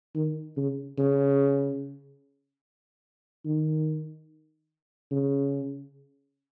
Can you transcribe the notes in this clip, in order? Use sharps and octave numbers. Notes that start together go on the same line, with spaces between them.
D#3
C#3
C#3
D#3
C#3